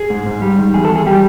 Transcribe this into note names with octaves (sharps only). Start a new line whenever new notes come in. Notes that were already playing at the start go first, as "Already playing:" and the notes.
Already playing: G#4
G#2
G#2
G3
D#3
E2 G#4
A4
E2
G#4
G3 G4